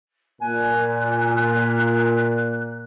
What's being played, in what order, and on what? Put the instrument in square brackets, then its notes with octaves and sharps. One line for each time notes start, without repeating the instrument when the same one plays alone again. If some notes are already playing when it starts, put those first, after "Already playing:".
[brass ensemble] A#2 [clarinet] G#5 [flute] F#6